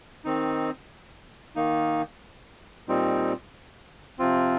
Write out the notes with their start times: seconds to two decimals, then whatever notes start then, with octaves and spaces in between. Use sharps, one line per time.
0.24 D#3 C4 D#4
1.56 D#3 A#3 D#4
2.88 A#2 G3 C4 D#4
4.19 C3 F3 C4 F4